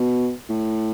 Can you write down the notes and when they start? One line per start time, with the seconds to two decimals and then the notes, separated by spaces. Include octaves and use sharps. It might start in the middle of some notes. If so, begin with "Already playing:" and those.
Already playing: B2
0.49 A2